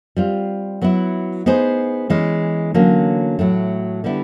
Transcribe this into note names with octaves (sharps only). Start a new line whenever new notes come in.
G3 C4 F4
F#3 B3 E4
B3 D#4 G#4 C5
E3 G#3 C#4
D3 F#3 A#3 C#4
A2 F#3 A3
D3 G3 B3 E4